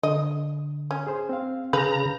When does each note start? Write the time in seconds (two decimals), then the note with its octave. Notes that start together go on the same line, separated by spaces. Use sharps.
0.03 D3 D#5
0.91 C#4
1.07 G#4 C5
1.29 C4 F5
1.73 C#3 G#4 B4 F5 A#5 G6